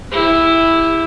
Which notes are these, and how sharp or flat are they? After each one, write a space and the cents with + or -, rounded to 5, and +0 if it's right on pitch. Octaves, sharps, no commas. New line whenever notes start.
E4 +0 G4 +40